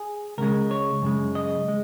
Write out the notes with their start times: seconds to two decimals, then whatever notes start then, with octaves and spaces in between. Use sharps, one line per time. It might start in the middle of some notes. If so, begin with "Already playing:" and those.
Already playing: G#4
0.38 C#2 C#3 G#3 A#4
0.71 C#5
1.02 F#2 C#3 G#3
1.35 D#5
1.68 G#3